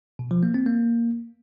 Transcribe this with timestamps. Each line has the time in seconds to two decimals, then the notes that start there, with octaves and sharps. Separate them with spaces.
0.19 B2
0.31 F3
0.43 A#3
0.54 C4
0.66 A#3